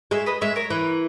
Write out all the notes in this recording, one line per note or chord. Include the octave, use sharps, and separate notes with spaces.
G#3 C#5 E5
B4 D#5
G#3 C#5 E5
A#4 C#5
E3